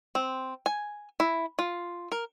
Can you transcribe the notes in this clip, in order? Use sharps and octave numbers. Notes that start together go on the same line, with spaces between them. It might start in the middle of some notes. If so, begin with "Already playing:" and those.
C4
G#5
E4
F4
A#4